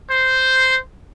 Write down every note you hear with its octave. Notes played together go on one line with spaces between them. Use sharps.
C5